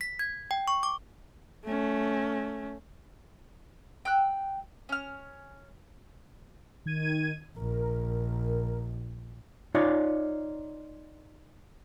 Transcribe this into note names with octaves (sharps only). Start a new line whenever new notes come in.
B6
G#6
G5
C#6
D6
A3 C#4
G5 E6 F#6
C#4 F6
D#3 G#6 D#7
A#1 A#4
D#4 F4 C#5 D5